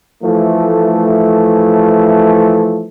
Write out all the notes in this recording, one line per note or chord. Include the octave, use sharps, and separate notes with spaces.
E3 F3 A3